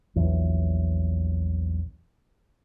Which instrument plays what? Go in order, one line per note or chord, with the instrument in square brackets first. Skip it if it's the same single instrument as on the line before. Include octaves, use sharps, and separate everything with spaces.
[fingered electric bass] A#1 E2 E3 F#3